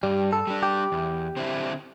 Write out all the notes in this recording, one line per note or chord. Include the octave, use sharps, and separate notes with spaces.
G2 G3
A4
G3 D4
G4
E2
D3 C4 E4